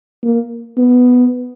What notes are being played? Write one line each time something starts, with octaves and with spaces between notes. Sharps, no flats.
A#3
B3